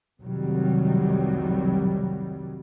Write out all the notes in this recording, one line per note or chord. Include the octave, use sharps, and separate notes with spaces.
F1 C2 D#3 F#3 G3